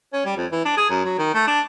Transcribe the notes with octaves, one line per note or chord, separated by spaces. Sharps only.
C#4
G3
F2
E3
D4
G#4
F#2
F#3
D#3
A3
D4